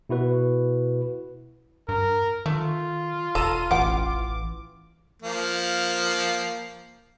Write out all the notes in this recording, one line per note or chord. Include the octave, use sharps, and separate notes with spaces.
B2 E4 F#4 B4
G2 A#4
D#3 A3 F4
E1 A4 A#5 D#7
A1 E3 F#5 G5 D6
F3 A#3